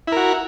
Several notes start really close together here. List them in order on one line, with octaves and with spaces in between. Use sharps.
E4 A#4 F#4